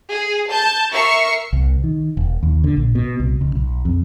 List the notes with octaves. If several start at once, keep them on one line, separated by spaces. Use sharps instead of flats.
G#4
A5 G6
A#4 E5 C#6 C7
C2
D#3
E1
D#2
D3
A#1
B2
C2
C#2
B1
F2